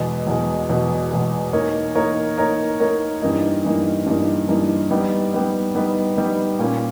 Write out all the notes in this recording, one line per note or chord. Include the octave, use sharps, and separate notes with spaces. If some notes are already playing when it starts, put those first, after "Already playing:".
Already playing: E2 B2 G#3
E2 B2 G#3
E2 B2 G#3
E2 B2 G#3
A#3 D#4 A#4 C#5
A#3 D#4 A#4 C#5
A#3 D#4 A#4 C#5
A#3 D#4 A#4 C#5
G2 E3 A#3 D#4
G2 E3 A#3 D#4
G2 E3 A#3 D#4
G2 E3 A#3 D#4
G3 B3 D#4
G3 B3 D#4
G3 B3 D#4
G3 B3 D#4
A#2 A#3 C#4